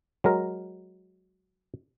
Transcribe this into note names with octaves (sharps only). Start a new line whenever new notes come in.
F#3 G#3 A#4